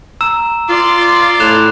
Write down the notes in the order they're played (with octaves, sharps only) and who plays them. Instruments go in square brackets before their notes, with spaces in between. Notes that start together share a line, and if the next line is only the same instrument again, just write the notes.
[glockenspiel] A#5 E6 E7
[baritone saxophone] F4 [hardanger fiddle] D5 C6
[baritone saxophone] A2 [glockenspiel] F#6 E7 F7